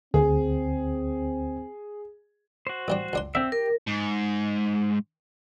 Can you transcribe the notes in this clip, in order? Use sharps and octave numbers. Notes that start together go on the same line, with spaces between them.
D2 C4 G#4
F#4 C5
A1 G3 D4
C#2 D4 C6
D3 C4 E5
G4 A#4
G#2